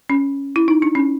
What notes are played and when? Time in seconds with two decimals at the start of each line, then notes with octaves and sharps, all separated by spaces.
0.10 C#4
0.56 E4
0.68 D#4
0.82 D4
0.95 C#4